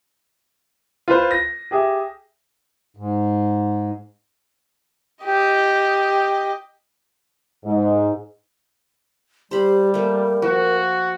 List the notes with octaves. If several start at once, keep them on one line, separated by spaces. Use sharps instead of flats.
F4 B4 C5
A#6
G4 G#4 E5
G#2
G4 D#5
G#2
G3 G4 C5 B5
A3 A#3 A#4
F3 F#4